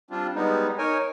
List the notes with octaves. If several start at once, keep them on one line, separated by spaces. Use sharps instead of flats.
G3 C4 D4 F4
G3 G#3 B3 D#4
D#4 A#4 C#5 G#5